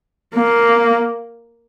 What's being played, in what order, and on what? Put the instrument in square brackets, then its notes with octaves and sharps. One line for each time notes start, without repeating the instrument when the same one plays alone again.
[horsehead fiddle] A#3